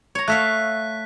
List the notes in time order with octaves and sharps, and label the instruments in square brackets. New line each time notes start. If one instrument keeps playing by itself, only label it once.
[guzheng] C#5 A#5
[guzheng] A3 E5 F5 [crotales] F#6 B6